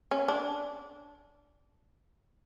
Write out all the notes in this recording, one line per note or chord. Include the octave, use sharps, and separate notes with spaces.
C#4
D4